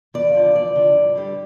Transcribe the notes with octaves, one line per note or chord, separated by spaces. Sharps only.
E2 D5
D3 F3
E2 D5
D3 F3
G2
D3 G3